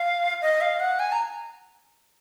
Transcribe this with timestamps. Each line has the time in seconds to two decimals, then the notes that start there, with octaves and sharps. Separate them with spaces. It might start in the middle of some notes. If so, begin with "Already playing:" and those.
Already playing: F5
0.42 D#5
0.61 F5
0.80 F#5
0.99 G#5
1.12 A#5